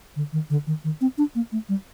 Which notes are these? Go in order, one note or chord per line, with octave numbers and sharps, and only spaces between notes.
D3
D#3
D3
D#3
D#3
C4
D4
A#3
A3
G3